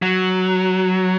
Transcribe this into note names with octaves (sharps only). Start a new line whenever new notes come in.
F#3